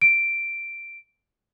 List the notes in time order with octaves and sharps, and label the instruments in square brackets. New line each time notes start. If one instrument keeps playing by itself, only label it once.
[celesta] D7